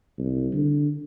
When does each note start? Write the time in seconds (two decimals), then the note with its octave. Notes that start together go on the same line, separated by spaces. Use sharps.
0.18 C2
0.53 D3